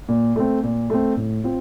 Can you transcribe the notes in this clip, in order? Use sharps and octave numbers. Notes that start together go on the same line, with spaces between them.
A#2
A3 C4
A#2
A3 C4
A2
C4 F4